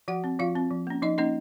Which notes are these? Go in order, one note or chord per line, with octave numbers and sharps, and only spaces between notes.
F3 F#4 F#5
C4
F3 F4 F5
C4
F3
A#3 C#4
F3 D#4 D#5
A#3 C#4 D#4 D#5